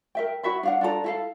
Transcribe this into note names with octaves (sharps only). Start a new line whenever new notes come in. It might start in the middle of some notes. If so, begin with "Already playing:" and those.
A#4 E5 G5
E4 F#4 E5 B5
D4 F5 F#5
D4 F4 A4 A#5
E4 A4 F5